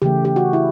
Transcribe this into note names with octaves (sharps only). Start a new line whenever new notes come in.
C#3 E3 A3 G4
G4
F#4
E4